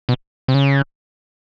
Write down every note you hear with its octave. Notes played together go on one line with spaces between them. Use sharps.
B2
C3
C#3